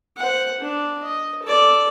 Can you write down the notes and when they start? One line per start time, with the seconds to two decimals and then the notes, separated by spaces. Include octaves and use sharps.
0.17 C5 F#5
0.60 D4
1.03 D#5
1.43 A4 D5